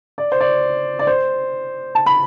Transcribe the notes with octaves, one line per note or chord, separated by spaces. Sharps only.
D5
C5
D5
D5
C5
A5
B5